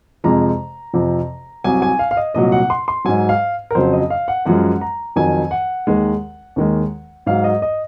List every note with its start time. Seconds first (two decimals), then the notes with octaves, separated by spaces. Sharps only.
0.24 F2 C3 F3 G#3 A#5
0.93 F2 C3 F3
1.64 C2 C3 F#3 G#5
1.82 G#5
1.99 F5
2.11 F5
2.17 D#5
2.34 C2 A#2 F#3 D#5
2.52 F#5
2.70 C6
2.88 C6
3.05 G#2 F#3 G#5
3.29 F5
3.71 A#4
3.75 F2 C#3 F#3 C5
3.93 D#5
4.10 F5
4.28 F#5
4.46 F#2 F3 G#3 F#5
4.81 A#5
5.16 F2 D#3 F#3 G#5
5.51 F#5
5.87 D#2 D#3 G#3
6.56 D#2 D#3 G#3
7.26 G#2 F#3 F5
7.44 D#5
7.62 D#5